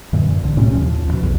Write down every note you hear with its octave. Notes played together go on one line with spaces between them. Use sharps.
F#2 A#2 D3 E3
C2 D3
A2 C3 C4 C#4
D#2 F3
D2 B2
B1 E2